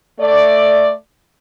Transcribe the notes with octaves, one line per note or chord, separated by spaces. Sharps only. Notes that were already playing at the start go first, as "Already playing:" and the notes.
A3 D5